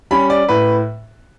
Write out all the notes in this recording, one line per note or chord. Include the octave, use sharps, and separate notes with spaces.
G3 C#4 B5
D5
A2 B4